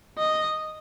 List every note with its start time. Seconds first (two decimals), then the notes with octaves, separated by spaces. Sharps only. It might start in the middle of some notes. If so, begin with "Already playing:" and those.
0.18 D#5